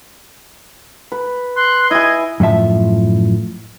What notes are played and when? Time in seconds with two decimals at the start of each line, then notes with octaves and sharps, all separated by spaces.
1.12 B4
1.56 C6 F#6
1.91 E4 G#4 D#5 G#6
2.40 F#2 A2 F3 E5 A5